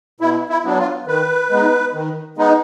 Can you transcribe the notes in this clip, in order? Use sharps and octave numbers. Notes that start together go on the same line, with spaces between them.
B2 E4
E4
F#3 B3 D4
F4
D#3 B4
G#3 B3 D#4
D#3
G#3 B3 D#4